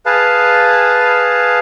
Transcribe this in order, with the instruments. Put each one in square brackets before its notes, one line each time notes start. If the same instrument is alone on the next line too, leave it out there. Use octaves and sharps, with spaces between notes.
[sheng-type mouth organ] G#4 B4 F5 A5